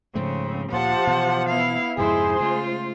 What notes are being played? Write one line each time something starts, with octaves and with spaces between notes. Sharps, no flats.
G#2 C#3 F3 A3 C4
D2 A#2 F3 G4 C5 F#5 A5
B2 E3
B3 E4 F5
F2 G#2 C3 G#3 E4 G#4 C5 C6
C#3 A3 F4